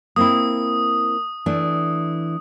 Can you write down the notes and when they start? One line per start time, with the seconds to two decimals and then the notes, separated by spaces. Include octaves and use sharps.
0.16 A#3 C4 E4 D#6
1.46 E3 A3 D4